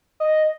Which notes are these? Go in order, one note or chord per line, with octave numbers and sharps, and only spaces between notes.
D#5